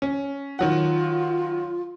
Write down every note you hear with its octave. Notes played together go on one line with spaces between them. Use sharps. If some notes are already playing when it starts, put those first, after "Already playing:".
C#4
D#3 F#3 F4 F#5